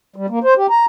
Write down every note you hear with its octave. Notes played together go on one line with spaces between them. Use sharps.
G3
A#3
C5
G4
A#5